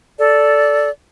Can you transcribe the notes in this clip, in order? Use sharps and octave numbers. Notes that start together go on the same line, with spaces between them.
A4 D5